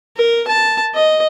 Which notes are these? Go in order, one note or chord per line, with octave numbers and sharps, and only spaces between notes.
A#4
A5
D#5